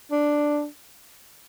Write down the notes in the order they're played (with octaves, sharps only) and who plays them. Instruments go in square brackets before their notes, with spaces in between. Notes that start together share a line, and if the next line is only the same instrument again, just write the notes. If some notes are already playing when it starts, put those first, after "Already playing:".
[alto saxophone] D4